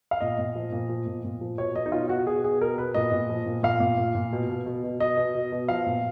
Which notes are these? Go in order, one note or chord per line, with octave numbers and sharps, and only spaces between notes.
F5
A#2 D#5
A#2
F3
A#2
F3
A#2
A#2
F3
B2 C#5
B2 D#5
D#4
B2 F4
B2 F#4
B2 G#4
B2 G#4
B2 A#4
B2 B4
A#2 D#5
A#2
F3
A#2
A#2 F5
A#2
A#2
A#2
B2
B2
B2
B2
B2 D#5
B2
B2
B2
F3 F5
A#2